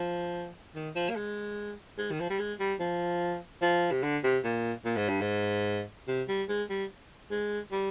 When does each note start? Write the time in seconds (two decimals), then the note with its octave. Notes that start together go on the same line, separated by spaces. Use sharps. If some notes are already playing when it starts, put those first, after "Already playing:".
Already playing: F3
0.75 D#3
0.95 F3
1.10 A#3
1.16 G#3
1.98 G#3
2.11 D#3
2.20 F3
2.30 G3
2.39 G#3
2.60 G3
2.80 F3
3.62 F3
3.91 C3
4.03 D3
4.24 C3
4.44 A#2
4.85 A#2
4.97 G#2
5.09 G2
5.21 G#2
6.08 C3
6.28 G3
6.49 G#3
6.70 G3
7.31 G#3
7.72 G3